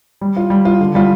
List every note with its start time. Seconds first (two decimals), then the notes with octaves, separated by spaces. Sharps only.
0.21 G3
0.36 F4
0.50 G3
0.65 F4
0.81 D3
0.95 G3 F4